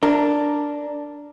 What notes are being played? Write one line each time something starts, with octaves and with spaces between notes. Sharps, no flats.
D4 A#4